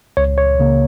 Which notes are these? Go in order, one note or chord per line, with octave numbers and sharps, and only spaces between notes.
C#2 C#5
C#5
C#3 A#3